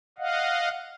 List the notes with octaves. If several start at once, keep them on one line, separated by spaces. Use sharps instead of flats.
D#5 F5 F#5